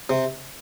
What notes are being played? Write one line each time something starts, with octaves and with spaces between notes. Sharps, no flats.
C3